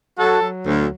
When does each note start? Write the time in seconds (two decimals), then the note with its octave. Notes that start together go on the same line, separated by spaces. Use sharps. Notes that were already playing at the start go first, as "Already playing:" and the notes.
0.19 F#3 F#4 A4
0.42 F#3
0.66 D2